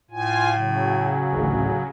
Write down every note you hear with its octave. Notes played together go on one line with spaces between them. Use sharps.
A2 F4 G#5
C#3 F#3
A1 D2